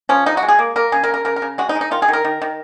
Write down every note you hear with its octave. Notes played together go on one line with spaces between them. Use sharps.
F3 C#4
G#3 D#4
F#4
G#3
G#4
A#3
A#3 A#4
C#3 G#4
A#4
C#3
A#4
C#3 A#4
A#4
C#3
G#3 F#4
D#4
G#3
D#4
D#3 F4
G#4
D#3
A#4
D#3
D#3